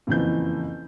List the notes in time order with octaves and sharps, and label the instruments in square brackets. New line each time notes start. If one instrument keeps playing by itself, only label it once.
[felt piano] F#1 F2 E3 G6